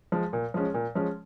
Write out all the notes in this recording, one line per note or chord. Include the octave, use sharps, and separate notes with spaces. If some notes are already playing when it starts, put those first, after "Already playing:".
F3 G#3
A#2
F3 G#3 C#4
A#2
F3 G#3 C#4